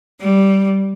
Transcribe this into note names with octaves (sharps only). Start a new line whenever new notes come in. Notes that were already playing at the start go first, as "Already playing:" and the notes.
G3